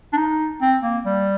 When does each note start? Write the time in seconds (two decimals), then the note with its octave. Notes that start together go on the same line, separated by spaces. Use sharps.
0.13 D4
0.17 D#4
0.62 C4
0.83 A#3
1.05 G3